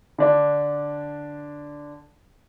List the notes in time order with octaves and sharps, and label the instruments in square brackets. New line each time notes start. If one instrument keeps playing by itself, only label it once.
[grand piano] D3 D4